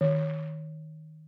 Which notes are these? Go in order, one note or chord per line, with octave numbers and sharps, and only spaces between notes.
D#3